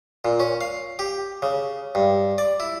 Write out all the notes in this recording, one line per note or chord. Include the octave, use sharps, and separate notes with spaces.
A#2
C#4
F5
G4
C#3
G2
D5
E4